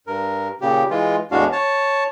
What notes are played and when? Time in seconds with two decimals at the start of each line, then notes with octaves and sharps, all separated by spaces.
0.07 G2 A#4
0.61 A#2 C#3 G4
0.90 E3 G#3 F4
1.31 E2 A2 G#3 D4 F#4 F5
1.52 C#5 A5